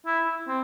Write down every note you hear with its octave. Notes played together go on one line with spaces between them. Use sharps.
E4
C4